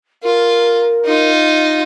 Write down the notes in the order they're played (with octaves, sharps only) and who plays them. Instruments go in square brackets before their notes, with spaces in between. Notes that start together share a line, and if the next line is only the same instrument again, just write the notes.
[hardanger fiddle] F4 [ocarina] A#4
[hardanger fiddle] D#4 F4